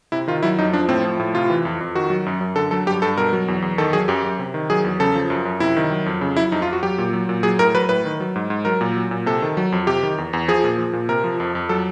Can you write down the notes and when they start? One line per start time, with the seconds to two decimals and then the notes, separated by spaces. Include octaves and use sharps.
0.12 C3 E4
0.28 D#3 F4
0.43 F#3 E4
0.58 F2 D#4
0.73 F3 D4
0.89 A2 C4
1.04 F3
1.20 A2
1.34 C3 F4
1.50 E3
1.65 F2
1.81 F2
1.95 D#3 F#4
2.10 F#3
2.26 F#2
2.41 F#2
2.56 D3 A4
2.71 F#3 A4
2.87 G2 G4
3.02 G2 A4
3.17 B2 A#4
3.33 F#3
3.48 E2
3.62 E2
3.78 D#3 A4
3.93 F#3 G#4
4.08 F#2 G4
4.24 F#2
4.39 C3
4.54 D#3
4.70 F#3 G#4
4.85 E2
5.00 C#3 A4
5.15 F3
5.30 F#2
5.45 F#2
5.60 C3 E4
5.77 D#3
5.91 F#3
6.06 F2
6.21 C#3
6.37 F#3 E4
6.52 F2 D#4
6.62 F4
6.67 F2
6.73 F#4
6.83 F#3 G4
6.98 A#2
7.13 F#3
7.29 A#2
7.43 F#3 G#4
7.59 A2 A#4
7.75 F#3 B4
7.89 A2 B4
8.05 D#3
8.20 F#3
8.36 G#2
8.50 G#2
8.65 F#3 A#4
8.81 A#2
8.96 F#3
9.11 A#2
9.26 C3 A4
9.42 D#3
9.57 F#3
9.72 F2
9.87 C3 G4
10.03 D#3
10.18 E2
10.33 E2
10.48 F3 G#4
10.64 A#2
10.78 F3
10.93 A#2
11.09 C3 A#4
11.24 F3
11.40 F2
11.55 F2
11.69 F#3 A4